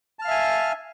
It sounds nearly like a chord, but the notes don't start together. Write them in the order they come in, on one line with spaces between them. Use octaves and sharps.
A5 F6 F5 E5 G#5